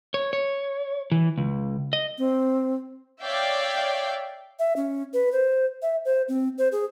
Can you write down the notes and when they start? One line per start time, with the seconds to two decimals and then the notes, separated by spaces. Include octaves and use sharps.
0.14 C#5
0.33 C#5
1.12 E3
1.38 C#2
1.93 D#5
2.18 C4
3.23 C#5 D5 E5 F5 G5
4.59 E5
4.76 C#4
5.13 B4
5.32 C5
5.82 E5
6.05 C5
6.28 C4
6.58 C5
6.72 G#4